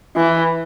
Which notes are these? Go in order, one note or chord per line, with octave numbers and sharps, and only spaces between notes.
E3